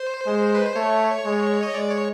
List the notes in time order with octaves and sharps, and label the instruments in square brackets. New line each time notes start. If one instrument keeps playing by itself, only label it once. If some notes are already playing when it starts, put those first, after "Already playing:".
Already playing: [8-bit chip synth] C5
[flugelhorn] G#3
[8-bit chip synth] B4
C5
[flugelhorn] A3 [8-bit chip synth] C#5
[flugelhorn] G#3
[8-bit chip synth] D#5
[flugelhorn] G#3 [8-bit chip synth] D5
[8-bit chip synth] C#5